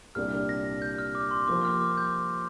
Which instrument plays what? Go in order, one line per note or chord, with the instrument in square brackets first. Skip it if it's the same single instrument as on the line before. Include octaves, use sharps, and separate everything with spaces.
[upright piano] C2 A#2 G3 D4 [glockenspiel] F6
[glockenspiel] A#6
G6
F6
D6
C6
[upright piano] F3 A#3 G4 C5 [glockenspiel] D6
[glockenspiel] F6
D6
G6